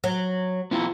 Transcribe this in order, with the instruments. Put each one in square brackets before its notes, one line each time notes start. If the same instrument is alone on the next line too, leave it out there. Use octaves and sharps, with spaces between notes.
[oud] F#3
[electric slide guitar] B3 E4 F4